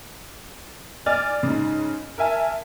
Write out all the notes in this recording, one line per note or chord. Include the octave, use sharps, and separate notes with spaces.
D5 G#5 F6 A6
G#2 C#3
A#4 E5 G#5 A5